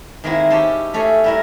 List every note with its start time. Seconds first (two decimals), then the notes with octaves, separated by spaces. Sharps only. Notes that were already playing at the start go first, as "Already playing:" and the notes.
0.24 D#3 G#3 A#3 C4 E4
0.50 C#4 G4 A5 C6
0.94 A3 C#4 G#4 A4
1.24 G3 E4 A#4